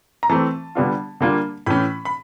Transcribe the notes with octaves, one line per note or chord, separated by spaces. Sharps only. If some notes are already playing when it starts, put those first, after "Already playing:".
A#5
E3 A3 C4 A5
D3 G3 B3 D4 F4
D3 G3 A#3 D4 F4
A2 E3 A3 C#4 B5
B5